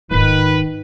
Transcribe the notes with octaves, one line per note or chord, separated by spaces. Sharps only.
D1 G#2 D#3 F4 B4